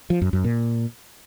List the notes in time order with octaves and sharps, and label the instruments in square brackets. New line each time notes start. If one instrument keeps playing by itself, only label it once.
[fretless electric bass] F3
F#2
F#2
A#2